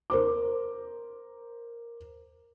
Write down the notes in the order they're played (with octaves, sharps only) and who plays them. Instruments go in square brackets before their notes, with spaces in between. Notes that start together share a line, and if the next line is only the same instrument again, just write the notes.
[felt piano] A#4 C5 D6